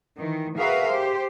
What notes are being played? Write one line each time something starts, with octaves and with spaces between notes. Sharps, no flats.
D#3 E3
F#4 G#4 A#4 B4 E5 F5
G4 C5